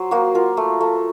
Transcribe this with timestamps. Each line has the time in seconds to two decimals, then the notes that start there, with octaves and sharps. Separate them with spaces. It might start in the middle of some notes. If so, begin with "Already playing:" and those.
Already playing: F#3 C5
0.11 A#3 F#4
0.34 F4 A#4
0.57 A3
0.81 A3